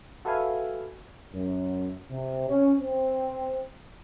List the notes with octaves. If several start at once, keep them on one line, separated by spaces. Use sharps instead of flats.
F#4 A4 B4 E5 F5 G#5
F#2
C3
C#4
C4